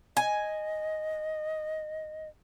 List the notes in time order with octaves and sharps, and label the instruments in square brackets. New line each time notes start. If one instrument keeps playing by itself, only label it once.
[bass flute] D#5 [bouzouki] G#5